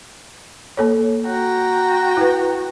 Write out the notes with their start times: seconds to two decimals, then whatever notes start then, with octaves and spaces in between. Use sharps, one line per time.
0.77 A#3 A4 C#5
1.24 F#4 G5 A#5
2.17 E4 B4